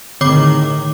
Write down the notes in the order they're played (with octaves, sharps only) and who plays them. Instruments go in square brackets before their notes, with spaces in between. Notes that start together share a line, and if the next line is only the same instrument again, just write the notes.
[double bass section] A2 D#3 [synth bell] D3 C#5 D6